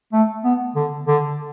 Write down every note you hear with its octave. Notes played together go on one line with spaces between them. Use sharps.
A3
B3
D3
D3